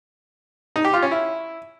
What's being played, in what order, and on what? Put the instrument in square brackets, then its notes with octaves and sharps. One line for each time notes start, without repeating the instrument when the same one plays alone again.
[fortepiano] D#4
G4
F4
C#4
E4